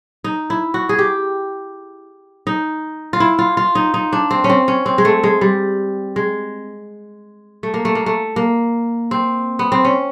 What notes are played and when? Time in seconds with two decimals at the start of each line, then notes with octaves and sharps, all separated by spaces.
0.24 D#4
0.50 E4
0.74 F#4
0.89 G#4
0.99 G4
2.47 D#4
3.13 F4
3.20 E4
3.39 F4
3.57 F4
3.75 D#4
3.94 D#4
4.13 D4
4.31 C4
4.44 C#4
4.49 C4
4.68 C#4
4.86 C4
4.98 G#3
5.05 A3
5.24 G#3
5.41 G3
6.16 G#3
7.63 A3
7.74 A#3
7.85 A3
7.95 A#3
8.06 A3
8.36 A#3
9.11 C4
9.59 B3
9.72 C4
9.85 C#4